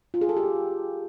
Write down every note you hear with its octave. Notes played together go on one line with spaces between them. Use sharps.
F4
G#4
A4
G4